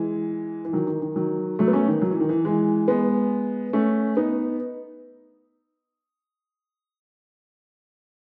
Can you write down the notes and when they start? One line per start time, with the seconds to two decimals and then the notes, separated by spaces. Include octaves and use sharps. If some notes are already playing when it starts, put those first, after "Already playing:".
Already playing: E3 G#3
0.65 E3
0.73 D#3 F#3
0.87 D#3
1.02 D#3
1.16 D#3 F#3
1.59 F#3 A3
1.68 B3
1.73 A3 C#4
1.88 D#3
2.01 F#3
2.11 E3
2.20 D#3
2.29 E3
2.45 E3 G#3
2.88 G#3 B3
3.73 A3 C#4
4.17 B3 D#4